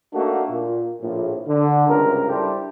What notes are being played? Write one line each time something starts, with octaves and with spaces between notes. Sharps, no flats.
A3 A#3 D4 D#4 F#4
A#2
A#1 A2
D3
C#2 G2 C3 A#4
G3 D4 E4 G4 A4 C5